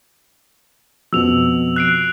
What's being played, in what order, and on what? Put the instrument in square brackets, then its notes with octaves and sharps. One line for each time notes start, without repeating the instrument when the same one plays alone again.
[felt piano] F2 B2 [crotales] E6 F7
[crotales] F#6 C7 D7